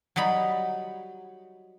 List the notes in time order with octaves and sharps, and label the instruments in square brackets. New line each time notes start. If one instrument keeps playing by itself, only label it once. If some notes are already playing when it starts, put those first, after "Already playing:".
[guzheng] F#3 G3 D#4 B5